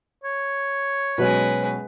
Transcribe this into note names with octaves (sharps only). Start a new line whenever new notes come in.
C#5
B2 F#3 G#3 C#4 B4